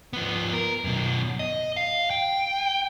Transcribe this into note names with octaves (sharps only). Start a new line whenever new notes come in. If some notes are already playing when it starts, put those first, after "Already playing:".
F3 B3
A#4
F#2 B2
D#5
F5
G5